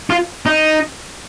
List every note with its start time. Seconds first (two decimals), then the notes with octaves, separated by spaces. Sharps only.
0.10 F4
0.46 D#4